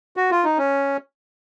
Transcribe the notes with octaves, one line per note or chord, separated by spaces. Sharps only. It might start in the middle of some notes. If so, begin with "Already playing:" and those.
F#4
F4
D#4
C#4